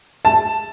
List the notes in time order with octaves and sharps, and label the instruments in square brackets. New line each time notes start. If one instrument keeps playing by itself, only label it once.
[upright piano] A5